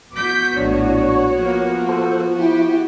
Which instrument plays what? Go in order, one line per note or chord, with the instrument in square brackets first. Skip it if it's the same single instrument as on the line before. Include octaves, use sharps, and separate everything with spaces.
[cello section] B3 F#4 [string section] D6 G6 B6
[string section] A#1 A2 [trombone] D4 [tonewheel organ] C#5
[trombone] F3 [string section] A#3
[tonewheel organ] A4 C5
[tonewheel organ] E4 [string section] G4